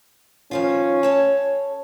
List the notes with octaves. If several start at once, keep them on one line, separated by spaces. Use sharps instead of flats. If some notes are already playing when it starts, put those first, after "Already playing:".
D#3 F3 C#4 F4
A4 C#5 A5